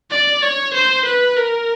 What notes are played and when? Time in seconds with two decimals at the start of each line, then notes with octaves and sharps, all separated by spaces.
0.11 D5
0.42 C#5
0.74 C5
1.06 B4
1.37 A#4